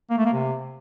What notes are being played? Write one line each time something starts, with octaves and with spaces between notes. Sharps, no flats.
A#3
A3
A#3
C3